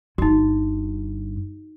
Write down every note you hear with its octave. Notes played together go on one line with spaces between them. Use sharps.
G1 G2 D#4 F#4